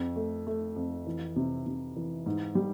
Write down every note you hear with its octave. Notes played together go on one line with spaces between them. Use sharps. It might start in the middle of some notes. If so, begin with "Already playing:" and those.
Already playing: F2
A3
A3
F2
E3
C3
C3
E3
G#2
G3